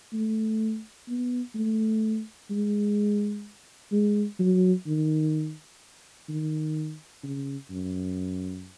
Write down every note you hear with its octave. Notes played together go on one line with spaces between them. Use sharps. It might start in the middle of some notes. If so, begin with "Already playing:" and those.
A3
B3
A3
G#3
G#3
F#3
D#3
D#3
C#3
F#2